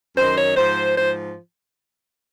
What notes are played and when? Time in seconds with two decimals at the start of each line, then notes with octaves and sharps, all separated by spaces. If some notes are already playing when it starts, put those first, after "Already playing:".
0.16 F#2 D#3 C5
0.37 C#5
0.56 G#2 F3 C5
0.96 G#2 F3 C5